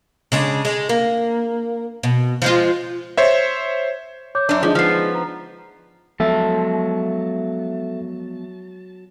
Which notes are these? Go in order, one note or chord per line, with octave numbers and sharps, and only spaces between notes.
C#3 G#3 D4
G#3
A#3
B2
F3 G#3 F4
C5 C#5 E5
C#5 D6 G6
F#2 D4
F3 G#3 D4 D#4
F3 B3 F6 C7
A#5
F3 F#3 G#3 B3 A4 E5 A5